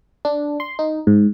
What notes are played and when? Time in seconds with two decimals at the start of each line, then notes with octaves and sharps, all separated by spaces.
0.25 D4
0.60 C6
0.79 D#4
1.07 G#2